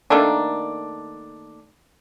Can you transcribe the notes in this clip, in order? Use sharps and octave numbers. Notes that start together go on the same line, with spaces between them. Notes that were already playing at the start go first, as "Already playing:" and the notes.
D#3 A3 A#3 D4